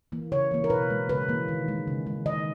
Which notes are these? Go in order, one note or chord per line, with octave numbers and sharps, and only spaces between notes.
E3 A#3
C#3 C#5
E3 A#3
A#4
B2 B4
G#3
C#3 B4
E3 A#3
D#3
G#3
C#3
G#3
D#3 D#5